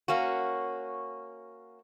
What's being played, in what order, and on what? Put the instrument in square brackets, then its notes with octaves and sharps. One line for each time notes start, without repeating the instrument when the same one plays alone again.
[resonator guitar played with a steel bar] A#3 C#4 F#4